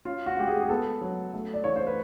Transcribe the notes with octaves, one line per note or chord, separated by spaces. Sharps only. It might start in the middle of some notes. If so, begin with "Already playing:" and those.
C#4 F4
F#4
G#3 G4
G#4
G#4
B3 A4
F#3
A3
D5
E3 C#5
C5
B4